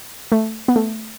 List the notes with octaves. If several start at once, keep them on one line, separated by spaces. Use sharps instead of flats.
A3
B3
A3